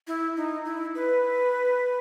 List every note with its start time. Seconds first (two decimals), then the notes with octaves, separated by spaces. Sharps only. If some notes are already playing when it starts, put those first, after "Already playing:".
0.07 E4
0.37 D#4
0.65 E4
0.95 B4